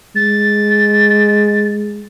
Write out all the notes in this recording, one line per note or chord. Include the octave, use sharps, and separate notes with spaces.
G#3 A6